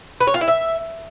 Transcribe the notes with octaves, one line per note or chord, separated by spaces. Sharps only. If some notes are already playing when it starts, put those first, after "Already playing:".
B4
C#5
F4
E4
E5